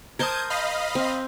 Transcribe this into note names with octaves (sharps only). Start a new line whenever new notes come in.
A#4 C5 A5 D#6 G6 G#6
D#5 F5 B5
C4